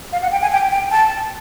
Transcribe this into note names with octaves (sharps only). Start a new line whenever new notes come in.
F5
F#5
G5
G#5
G5
G5
A5